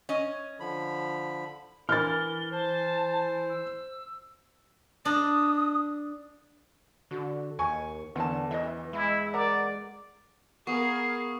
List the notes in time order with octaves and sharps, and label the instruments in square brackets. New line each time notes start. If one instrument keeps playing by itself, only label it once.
[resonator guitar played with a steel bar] C#4 D#5
[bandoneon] D3 F3 B5
[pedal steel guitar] E3 [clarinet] A#4 [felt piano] F6 A6 [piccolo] G7
[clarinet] C5 [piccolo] A5
[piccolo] E6
[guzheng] D4 [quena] D#6
[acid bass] D3 [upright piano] F#4
[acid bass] D#2 [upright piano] G#5 C#6
[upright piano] E2 [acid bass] D3 [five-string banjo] F#5 A5
[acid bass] E3 [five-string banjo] D#5 E5
[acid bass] G#3 [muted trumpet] E4
[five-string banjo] A#4 F#5 A#5 [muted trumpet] D5
[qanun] B3 [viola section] G#4 A#4 F5 [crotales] C#6 D#6 [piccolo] C7